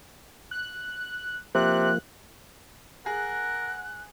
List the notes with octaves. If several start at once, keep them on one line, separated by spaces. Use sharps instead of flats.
F#6
C3 F3 A#3 F#6
G#4 A#4 F#5 F#6